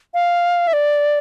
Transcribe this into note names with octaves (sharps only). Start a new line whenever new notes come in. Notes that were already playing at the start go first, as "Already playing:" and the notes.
F5
E5
D5